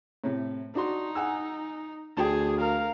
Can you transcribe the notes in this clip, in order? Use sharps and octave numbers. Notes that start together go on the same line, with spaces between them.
A2 C3
D4 D#4 F#4 C6
F#5 G#5 E6
D2 G#4 G5 A5
A#4 F5